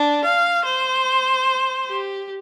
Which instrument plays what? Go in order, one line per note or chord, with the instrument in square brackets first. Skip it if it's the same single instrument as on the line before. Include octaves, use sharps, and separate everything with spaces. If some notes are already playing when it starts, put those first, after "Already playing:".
Already playing: [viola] D4
F5
C5
G4